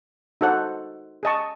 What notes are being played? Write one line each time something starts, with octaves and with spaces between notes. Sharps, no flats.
D#4 F#4 A4 C5 F#5
G#4 D#5 A5 C#6